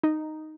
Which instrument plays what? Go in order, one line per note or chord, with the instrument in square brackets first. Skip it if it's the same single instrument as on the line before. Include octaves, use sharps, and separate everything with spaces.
[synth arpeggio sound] D#4